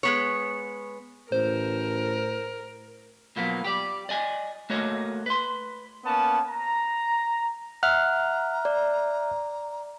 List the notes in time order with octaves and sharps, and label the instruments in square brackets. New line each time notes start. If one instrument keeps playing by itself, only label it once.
[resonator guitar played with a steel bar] G#3 B3 C#5
[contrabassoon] A1 [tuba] A2 [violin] A#4 [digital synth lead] C5
[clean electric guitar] B2 F3 F#3 A#3 B3
G4 D5
D5 D#5 G#5
A3 A#3 F#4 C#5 D#5
B4 C6
[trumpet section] A#3 B3 C#4 A5
A#5
[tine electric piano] E5 F6 F#6 [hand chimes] F#5 [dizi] A#5
[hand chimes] D5